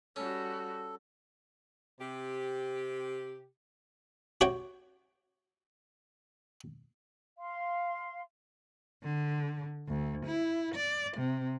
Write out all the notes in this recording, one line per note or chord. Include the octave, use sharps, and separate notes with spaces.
G3 C#4 F#4 A4
C3 G4
F#4 G4 C#5 G5
F5 C6
D3
D2
E4
D5
C3